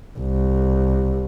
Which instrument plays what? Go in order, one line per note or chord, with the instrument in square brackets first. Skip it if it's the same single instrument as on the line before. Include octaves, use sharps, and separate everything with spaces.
[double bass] C2